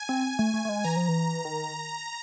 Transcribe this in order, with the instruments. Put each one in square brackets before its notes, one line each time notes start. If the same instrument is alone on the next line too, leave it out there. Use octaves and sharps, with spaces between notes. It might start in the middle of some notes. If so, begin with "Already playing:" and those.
Already playing: [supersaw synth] G#5
[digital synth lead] C4
A3
A3
A3
G#3
[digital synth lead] E3 [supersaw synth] A#5
[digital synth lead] F3
E3
D#3